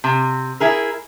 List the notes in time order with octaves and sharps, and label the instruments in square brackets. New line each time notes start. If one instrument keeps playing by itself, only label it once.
[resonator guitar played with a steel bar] C3
E4 G#4 A#4